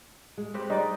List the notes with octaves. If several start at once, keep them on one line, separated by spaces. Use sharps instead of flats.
G#3
C4 G4 B4
G3 D#4 D5 D#5